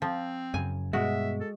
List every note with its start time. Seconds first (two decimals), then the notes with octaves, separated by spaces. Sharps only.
0.02 F3 C4
0.54 F#2 C#3 G#5
0.93 G2 B2 G#3 F#4 E5
1.40 A4